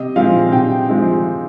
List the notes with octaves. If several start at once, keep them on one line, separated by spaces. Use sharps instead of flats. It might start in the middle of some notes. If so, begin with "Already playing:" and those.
Already playing: C3 D#5
F3 G#3 C4 F5
C3 G5
F3 G#3 C4